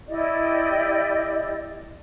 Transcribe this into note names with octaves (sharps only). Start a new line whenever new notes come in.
E4 G4 D5 D#5